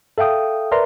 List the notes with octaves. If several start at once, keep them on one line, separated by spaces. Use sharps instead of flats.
A4 E5 F5 G5 D#6
A#4 B4 D5 E5 A#5 C6